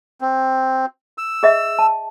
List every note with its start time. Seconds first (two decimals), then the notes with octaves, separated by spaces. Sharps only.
0.21 C4
1.18 E6
1.43 G#4 D#5 E5
1.79 A5